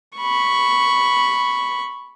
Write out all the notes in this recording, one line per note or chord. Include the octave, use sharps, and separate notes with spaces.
B5 C#6